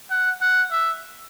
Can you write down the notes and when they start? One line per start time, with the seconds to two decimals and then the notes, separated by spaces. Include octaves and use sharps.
0.11 F#5
0.41 F#5
0.71 E5